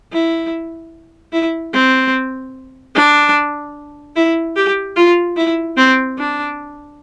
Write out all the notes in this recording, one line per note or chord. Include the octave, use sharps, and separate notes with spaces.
E4
E4
C4
D4
E4
G4
F4
E4
C4
D4